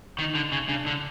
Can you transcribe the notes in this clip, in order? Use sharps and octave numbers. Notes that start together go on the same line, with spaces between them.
D#3 D#4
D3
C#3
C#3 D4
D3